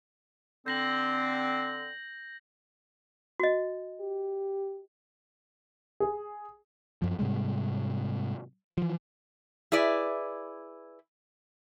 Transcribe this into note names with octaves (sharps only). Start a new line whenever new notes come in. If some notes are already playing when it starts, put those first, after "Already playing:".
D3 C4 G6 A#6 F#7
F#4 D#5
G4
G#4
F#2 F3
G#2 C3 G3 G#3
E3 F3
E4 G#4 B4 D5